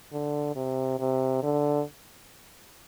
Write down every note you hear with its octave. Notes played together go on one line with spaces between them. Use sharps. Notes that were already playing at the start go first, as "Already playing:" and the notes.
D3
C3
C3
D3